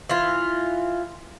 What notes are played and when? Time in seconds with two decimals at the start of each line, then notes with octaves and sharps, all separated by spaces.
0.09 E3 F4